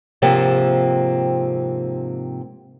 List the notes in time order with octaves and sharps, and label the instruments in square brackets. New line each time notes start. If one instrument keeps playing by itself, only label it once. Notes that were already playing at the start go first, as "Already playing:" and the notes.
[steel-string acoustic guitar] G#2 C3 F3 A#3 C4